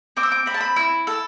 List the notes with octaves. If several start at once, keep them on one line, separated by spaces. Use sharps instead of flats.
C4 D6
E6
D6
C4 B5
A5
B5
E4
A4